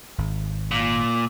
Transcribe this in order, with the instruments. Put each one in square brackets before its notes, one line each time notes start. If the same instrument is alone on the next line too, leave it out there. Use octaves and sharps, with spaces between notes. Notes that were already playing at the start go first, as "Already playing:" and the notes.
[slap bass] G#1
[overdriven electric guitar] A#2